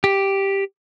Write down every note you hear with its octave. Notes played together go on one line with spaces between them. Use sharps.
G4